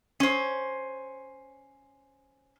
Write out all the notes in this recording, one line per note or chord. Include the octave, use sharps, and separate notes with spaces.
C#4 C5